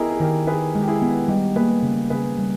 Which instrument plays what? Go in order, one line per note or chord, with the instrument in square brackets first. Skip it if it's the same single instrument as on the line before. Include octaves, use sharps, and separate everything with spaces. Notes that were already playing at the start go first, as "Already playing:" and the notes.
Already playing: [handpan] B3 [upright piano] D#4 E4 G4 G#4 A#4
[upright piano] G#4
[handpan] D#3 [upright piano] G4 A#4
[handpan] D#4 [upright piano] G#4 B4
[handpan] G#3
[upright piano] G4
E4 G#4
[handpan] B3
[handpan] G3 [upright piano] D#4 G4
[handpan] A#3 [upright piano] G#4 B4
[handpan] C#3
[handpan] C#3 [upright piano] G#4 B4
[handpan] G3